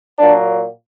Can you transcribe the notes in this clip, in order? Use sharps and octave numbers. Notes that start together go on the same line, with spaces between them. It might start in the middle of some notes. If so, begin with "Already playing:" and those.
A#2 F#3 A#3 D4